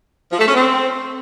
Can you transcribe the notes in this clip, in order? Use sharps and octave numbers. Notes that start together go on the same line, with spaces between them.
F3
A3
C#4
C4